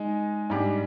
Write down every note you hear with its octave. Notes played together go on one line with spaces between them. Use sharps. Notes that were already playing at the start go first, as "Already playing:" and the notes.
Already playing: G#3 D#4
G#2 G3 D4